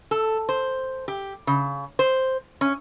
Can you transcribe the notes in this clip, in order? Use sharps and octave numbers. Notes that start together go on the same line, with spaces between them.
A4
C5
G4
C#3
C5
C#4